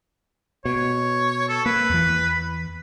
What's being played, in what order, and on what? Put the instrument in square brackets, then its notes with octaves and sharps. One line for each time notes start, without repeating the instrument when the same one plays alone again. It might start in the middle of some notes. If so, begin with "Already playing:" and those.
[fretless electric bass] B2 [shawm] C#5
[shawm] A4
[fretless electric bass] A#3 [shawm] B4
[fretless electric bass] E2 E3